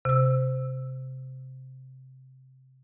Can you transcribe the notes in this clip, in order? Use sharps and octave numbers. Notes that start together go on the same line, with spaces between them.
C3 E6